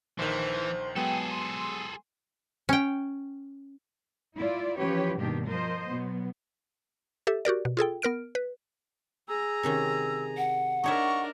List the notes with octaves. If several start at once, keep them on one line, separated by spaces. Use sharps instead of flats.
A#1 D#3 E3 C5
F#3 G#3 B3 G#4 A4 G5
C6
C#4 G5
E4 F4 D5
E3 F3 C#4 G4 B4 C#5
G2 B2 D#3 A#3 D4 G4
F3 A#4 C5 D#5
B2 F#3 B3
G4 A4 E5
F#4 G4 A#4 D5
B2
F4 G#4 A4 G5
B3 A#4 F6 D7
B4
G#4 A#5 E6
C3 D#3 C#4
F#5
D4 D#4 A#4 C#5 E5 C#6